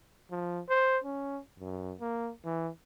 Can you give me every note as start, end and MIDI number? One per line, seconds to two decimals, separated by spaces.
0.31 0.61 53
0.69 0.98 72
1.04 1.39 61
1.59 1.94 42
2.00 2.31 58
2.45 2.69 52